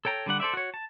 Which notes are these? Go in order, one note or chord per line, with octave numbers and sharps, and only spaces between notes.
A4 C#5 G5 A#5
D3 G3 D4 F#5
A4 C5 D5 E5
F#4 C#5
A5